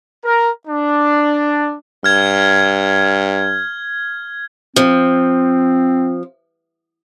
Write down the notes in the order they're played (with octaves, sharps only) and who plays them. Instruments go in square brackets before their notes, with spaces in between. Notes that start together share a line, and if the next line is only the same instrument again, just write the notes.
[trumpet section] A#4
D4
[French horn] G2 [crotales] F6 G#6
[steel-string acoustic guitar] F3 [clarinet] C4